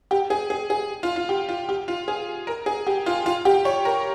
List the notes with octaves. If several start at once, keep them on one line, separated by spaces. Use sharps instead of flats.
G4
G#4
G#4
G#4
F4
F4
G4
F4
G4
F4
G#4
A#4
G#4
G4
F4
F4
G4
C#5
A#4